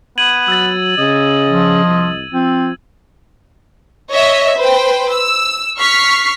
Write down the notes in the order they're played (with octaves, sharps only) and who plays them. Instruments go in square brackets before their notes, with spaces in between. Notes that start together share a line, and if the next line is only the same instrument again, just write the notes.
[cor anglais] B3 [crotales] G#6 D#7 F#7
[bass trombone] F#3 [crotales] E6 A6
[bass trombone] C#3 [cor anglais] D#5
[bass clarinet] F3
[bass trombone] C2
[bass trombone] F3 [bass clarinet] C4
[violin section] C#5 D#5 E5
B4 C5 G5
E6
C#6 F6 B6 C7